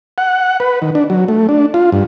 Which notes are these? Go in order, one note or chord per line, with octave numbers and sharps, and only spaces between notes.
F#5
B4
D#3
D4
F#3
A3
D4
F4
G2